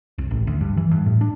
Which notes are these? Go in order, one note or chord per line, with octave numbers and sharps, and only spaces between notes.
C2
A1
D2
G2
E3
G2
A2
D4